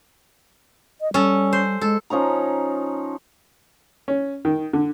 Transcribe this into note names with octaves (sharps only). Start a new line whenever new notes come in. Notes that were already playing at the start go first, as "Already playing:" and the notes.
D#5
G3 C#4 A4
C5
G#3 A4
F3 C#4 D#4 A#5
C#4
D#3
D3